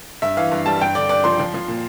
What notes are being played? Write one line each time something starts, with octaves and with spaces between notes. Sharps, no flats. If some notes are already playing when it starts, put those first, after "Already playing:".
G2 E5
E3 F5
G2
G3 A5
G2 G5
D3 D5
G2 D5
F3 C6
F3
F3
A#2